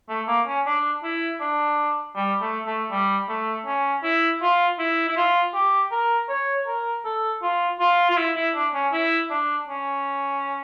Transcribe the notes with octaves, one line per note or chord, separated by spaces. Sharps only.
A3
A#3
C#4
D4
E4
D4
G3
A3
A3
G3
A3
C#4
E4
F4
E4
E4
F4
G4
A#4
C#5
A#4
A4
F4
F4
F4
E4
E4
D4
C#4
E4
D4
C#4